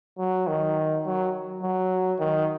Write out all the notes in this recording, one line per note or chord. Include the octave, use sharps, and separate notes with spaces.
F#3
D#3
F#3
F#3
D#3